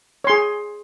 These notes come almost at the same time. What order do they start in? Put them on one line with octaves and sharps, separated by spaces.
C#5 C6 G#4